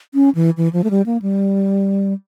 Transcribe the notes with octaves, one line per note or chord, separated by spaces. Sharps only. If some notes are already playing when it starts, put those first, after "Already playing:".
C#4
E3
E3
F3
A3
G3
A#3
G3